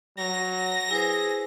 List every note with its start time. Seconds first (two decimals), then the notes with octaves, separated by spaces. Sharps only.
0.18 F#3 A#6
0.91 E4 G#4 B4 C5